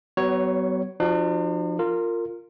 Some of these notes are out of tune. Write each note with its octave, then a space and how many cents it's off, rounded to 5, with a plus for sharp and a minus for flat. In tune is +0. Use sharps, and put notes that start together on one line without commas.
F#3 +35 B3 +15 C#5 +0
F3 +0 D4 +45 F#4 +15
F4 +0 A#4 -25